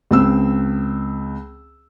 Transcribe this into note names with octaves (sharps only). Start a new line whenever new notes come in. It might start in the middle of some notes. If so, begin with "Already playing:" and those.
C#2 C4 E6